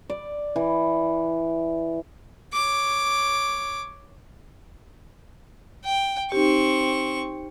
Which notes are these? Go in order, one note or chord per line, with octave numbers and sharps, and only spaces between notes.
D5
E3
C#5 D6
G5
C4 D#4 G4 C#6